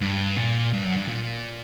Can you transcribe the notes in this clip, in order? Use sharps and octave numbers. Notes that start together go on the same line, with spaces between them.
G2
A#2
G2
F#2
G2
A#2